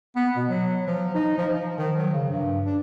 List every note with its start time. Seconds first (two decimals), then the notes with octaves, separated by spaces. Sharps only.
0.16 B3
0.36 B2
0.49 F#3
0.87 F3
1.14 D#4
1.37 F3
1.51 F3
1.78 D#3
1.97 F#3
2.13 C#3
2.29 G2
2.66 D4